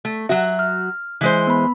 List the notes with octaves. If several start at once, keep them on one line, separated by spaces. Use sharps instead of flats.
A3
F#3 F#4 E5
F6
E3 G#3 C5
B3 B5